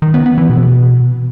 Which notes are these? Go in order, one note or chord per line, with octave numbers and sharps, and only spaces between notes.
D#3
B3
B3
E3
B2